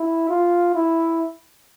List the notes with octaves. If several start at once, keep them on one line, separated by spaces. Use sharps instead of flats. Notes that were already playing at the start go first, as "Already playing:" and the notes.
Already playing: E4
F4
E4